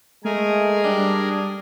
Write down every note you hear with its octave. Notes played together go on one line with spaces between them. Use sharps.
G#3 A3 G#4 A#4 G#5
G3 D4